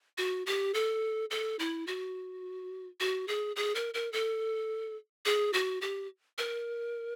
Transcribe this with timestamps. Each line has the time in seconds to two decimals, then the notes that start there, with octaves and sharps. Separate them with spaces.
0.18 F#4
0.46 G4
0.74 A4
1.31 A4
1.59 E4
1.87 F#4
3.00 F#4
3.28 G#4
3.56 G#4
3.75 A#4
3.94 A#4
4.13 A4
5.25 G#4
5.53 F#4
5.82 G4
6.38 A#4